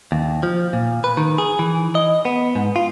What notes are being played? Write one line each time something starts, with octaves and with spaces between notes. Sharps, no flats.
D#2
F3
A#2
B4
D#3
G#4
E3
D#5
B3
G#2
F4